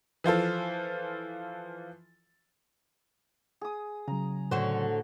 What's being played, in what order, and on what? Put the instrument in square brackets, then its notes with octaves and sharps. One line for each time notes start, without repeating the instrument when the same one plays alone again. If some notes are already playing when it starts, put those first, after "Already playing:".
[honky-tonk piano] E3 F3 F4 A4
[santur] G#4 D#6
[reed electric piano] C#3 F#3 [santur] A#5
[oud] A2 D3 C5 [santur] F#4 C#5